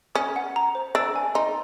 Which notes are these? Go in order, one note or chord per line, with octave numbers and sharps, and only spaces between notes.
C#4 D#6
F#5
A#5
C5
D4 E6
G#5
D#4 C6